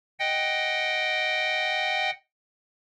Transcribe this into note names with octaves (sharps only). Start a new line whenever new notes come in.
D#5 F#5 G5